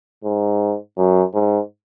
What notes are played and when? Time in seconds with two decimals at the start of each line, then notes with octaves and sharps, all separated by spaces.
0.24 G#2
0.97 F#2
1.33 G#2